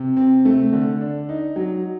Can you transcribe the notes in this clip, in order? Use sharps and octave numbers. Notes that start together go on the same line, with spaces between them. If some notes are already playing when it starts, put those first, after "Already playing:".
Already playing: C3
C4
A3
D3
D4
D#4
F#3